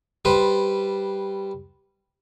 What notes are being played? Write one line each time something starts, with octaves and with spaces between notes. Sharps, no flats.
G3 B4 C5